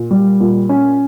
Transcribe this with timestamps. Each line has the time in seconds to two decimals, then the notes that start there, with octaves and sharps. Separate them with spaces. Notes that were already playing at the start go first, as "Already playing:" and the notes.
Already playing: A#2
0.11 G3
0.40 A#2
0.69 C#4